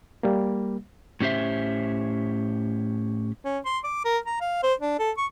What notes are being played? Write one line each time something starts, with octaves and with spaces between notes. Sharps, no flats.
G3 A#3
A2 C#4 G4 C5 E5
C#4
C6
D6
A#4
A#5
F5
C5
D4
A4
C#6